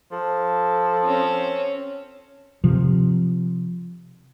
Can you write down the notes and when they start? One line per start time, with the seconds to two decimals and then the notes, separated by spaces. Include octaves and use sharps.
0.12 F3 A4
1.03 C4 C#4
2.64 C3 F3